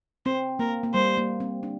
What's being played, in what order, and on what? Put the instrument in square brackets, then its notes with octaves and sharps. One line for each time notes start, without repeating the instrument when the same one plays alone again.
[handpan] C4 [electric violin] C5
[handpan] A#3 [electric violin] A#4
[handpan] A#3
[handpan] G3 [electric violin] C5
[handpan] A#3
C4
D4